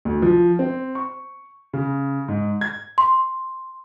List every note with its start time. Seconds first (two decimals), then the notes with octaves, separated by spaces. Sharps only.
0.05 D2
0.22 F3
0.59 C4
0.95 C#6
1.73 C#3
2.28 G#2
2.61 G#6
2.98 C6